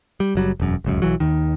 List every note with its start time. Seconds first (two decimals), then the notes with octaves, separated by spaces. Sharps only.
0.20 G3
0.35 F#1 F#3 G3
0.60 E1 F#2
0.84 D1 C#2 F#2
1.02 B1 E3 F#3
1.20 D#2 D#3